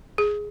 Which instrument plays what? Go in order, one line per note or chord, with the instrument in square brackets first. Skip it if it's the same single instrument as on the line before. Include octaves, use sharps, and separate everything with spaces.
[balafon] G#4